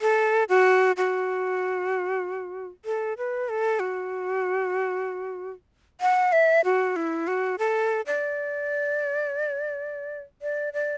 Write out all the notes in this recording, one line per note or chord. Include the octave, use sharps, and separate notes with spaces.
A4
F#4
F#4
A4
B4
A4
F#4
F#5
E5
F#4
E4
F#4
A4
D5
D5
D5